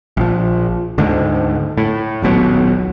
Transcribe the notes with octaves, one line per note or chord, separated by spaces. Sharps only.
A#1 F3
D2 G#2 D3
A2
D#1 B1 B2 F#3